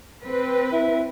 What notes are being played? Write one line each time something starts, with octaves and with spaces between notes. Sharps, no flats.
C4 B4
E4